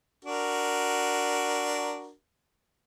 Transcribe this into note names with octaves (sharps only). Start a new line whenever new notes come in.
D4 F#4 A#4